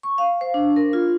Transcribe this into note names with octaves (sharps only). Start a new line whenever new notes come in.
C#6
F5
C5
D4
A#4
F4